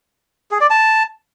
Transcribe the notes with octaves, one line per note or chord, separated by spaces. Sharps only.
G#4
D5
A5